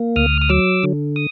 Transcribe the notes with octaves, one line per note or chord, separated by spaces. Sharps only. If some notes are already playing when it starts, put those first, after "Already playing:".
Already playing: A#3
D2 D#6 F6
D#6
F#3 D6 E6
D3
D#6